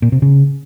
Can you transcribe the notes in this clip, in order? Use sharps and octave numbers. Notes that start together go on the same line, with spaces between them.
A#2
C3
C#3